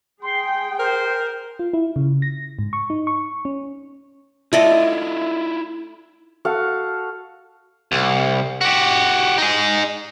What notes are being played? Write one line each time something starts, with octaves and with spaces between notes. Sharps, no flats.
G#4 G5 C6
A#4 C5
F4
E4
C#3
A#6
G#2
C#6
D#4
C#6
C#4
A3 E4 F4 D5 D#5
F#4 A4 F5
C2
F#4 G4
D#4 G#4